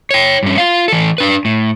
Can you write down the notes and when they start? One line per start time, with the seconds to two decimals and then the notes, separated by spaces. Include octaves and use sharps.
0.11 C#5 G5
0.43 G2 C#4
0.58 F4 F5
0.88 E3 A4
1.18 D4 B4
1.45 A2